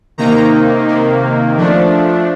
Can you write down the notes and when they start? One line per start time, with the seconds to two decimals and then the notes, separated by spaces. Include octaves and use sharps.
0.18 C3 D#3 A#3 D#4 A#5
0.88 C3 D#3 A#3
1.57 F3 A3 D4